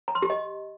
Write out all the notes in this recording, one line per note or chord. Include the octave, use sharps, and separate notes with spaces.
A#5
C6
G4
D#5